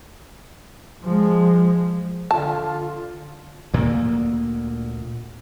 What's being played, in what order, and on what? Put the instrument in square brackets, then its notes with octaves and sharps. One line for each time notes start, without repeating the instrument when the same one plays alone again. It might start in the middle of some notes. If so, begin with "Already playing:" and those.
[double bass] F3 G#3
[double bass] D3 [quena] F4 [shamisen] A5
[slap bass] D2 A#2 A#3